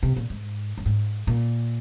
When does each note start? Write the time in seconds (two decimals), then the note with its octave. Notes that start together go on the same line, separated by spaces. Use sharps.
0.03 C3
0.17 A#2
0.30 G#2
0.78 G2
0.86 G#2
1.27 A#2